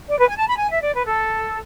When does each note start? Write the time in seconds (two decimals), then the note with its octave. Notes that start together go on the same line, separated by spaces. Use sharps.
0.09 D5
0.18 B4
0.28 G#5
0.37 A5
0.47 B5
0.58 G#5
0.71 E5
0.82 D5
0.95 B4
1.07 A4